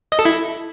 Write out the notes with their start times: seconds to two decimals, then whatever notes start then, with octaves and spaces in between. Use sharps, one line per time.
0.12 D#5
0.19 A4
0.25 E4